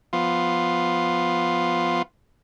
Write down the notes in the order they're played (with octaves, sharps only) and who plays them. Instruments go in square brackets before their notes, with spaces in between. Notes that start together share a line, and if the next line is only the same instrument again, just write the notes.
[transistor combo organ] F3 B3 F4